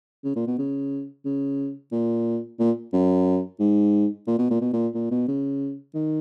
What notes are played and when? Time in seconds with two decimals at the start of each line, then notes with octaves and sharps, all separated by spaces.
0.24 C#3
0.36 A#2
0.47 B2
0.58 C#3
1.25 C#3
1.92 A#2
2.59 A#2
2.93 F#2
3.60 G#2
4.27 A#2
4.38 B2
4.50 A#2
4.61 B2
4.73 A#2
4.94 A#2
5.11 B2
5.28 C#3
5.95 D#3